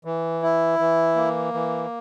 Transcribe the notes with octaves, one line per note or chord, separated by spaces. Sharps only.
E3
E4
E3
A#3
E3